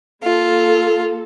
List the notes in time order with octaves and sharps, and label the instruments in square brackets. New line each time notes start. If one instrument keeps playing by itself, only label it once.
[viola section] A#3 A4 [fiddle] F4